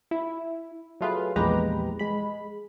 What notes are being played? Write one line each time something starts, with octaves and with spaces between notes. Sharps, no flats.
E4
F#3 A3 F4 G#4 B4
A#1 E2 G#3 G4 B4 A#5
G#3 B5